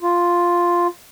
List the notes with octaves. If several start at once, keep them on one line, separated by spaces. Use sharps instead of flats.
F4